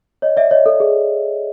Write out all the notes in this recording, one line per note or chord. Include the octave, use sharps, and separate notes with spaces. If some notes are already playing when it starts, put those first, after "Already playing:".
C#5 D#5
D5 E5
C#5 D#5
A4
G#4